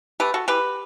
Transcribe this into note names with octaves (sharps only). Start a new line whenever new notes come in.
A3 G4 B4
F#4 A4
E3 G4 B4